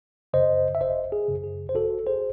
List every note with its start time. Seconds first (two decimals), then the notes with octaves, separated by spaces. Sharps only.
0.33 F#2 C#3 C5 D#5
0.75 E5
0.81 G#1 C5 D#5
1.12 G#4
1.28 F#2 C#3
1.44 G#4
1.69 C5
1.75 G#1 F#4 A4
2.06 G#4 C5